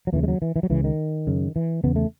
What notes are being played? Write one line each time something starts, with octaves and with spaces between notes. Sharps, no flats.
F#3
D#2 C#3 E3
G#3
F#3
E3
E3
F#3
C#2 C#3 E3
D#3
F#2 C#3
E3
E2 C#3 B3
A3